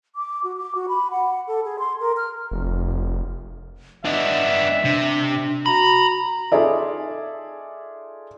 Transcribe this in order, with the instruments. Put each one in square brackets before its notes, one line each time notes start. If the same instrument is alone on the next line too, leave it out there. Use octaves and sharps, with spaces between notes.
[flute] D6
F#4
D6
F#4
B5
F#5
A4
G#4
C6
A#4
F6
[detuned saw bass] F1
[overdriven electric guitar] B3 D4 [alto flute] D#5 [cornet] E5
[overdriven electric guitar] C3 [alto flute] D4
[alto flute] F#4 [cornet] A#5 [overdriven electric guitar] B5
[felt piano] D#4 F4 G#4 A4 D5 E5